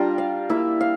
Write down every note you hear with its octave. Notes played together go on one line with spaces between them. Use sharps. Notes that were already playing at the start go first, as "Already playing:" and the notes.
Already playing: G3 D4 F4 A#5
F5
A#3 E4 E5
F5